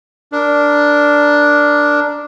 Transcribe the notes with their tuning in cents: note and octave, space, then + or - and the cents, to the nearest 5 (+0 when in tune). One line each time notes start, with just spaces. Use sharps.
D4 +0 A#4 +0